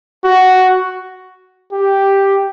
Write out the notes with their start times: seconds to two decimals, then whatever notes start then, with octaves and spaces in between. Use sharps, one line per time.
0.24 F#4
1.72 G4